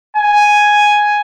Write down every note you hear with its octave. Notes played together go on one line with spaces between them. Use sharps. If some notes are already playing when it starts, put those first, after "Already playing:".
G#5